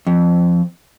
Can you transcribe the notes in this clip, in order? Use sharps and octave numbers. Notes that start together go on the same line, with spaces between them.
F2